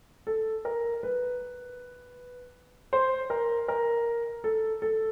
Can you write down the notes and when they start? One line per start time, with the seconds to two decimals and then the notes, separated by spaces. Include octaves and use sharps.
0.27 A4
0.65 A#4
1.03 B4
2.93 C5
3.30 A#4
3.68 A#4
4.44 A4
4.82 A4